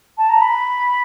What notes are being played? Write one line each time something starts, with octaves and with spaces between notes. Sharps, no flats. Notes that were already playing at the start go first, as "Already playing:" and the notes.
A5
A#5
B5